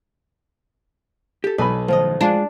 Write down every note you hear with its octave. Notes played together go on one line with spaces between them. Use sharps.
G4 A4
B1 B4 G#5 B5
A2 D#3 F3 D#5
G#3 D4 F4 G#4